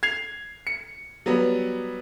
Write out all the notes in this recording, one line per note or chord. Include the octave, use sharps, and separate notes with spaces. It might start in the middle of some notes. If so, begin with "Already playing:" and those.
G#6 C7 F7
C#7
F#3 G3 B3